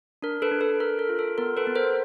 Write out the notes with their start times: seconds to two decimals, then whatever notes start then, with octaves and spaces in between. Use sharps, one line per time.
0.22 D4 A#4
0.42 A4 B4
0.51 D4
0.61 A4 B4
0.80 A4 A#4
0.99 A#4
1.09 F4
1.19 A4
1.38 B3 A#4
1.57 A4 B4
1.67 B3
1.75 A#4 C5